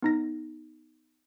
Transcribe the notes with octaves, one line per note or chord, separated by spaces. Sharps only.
B3 D#4 A#6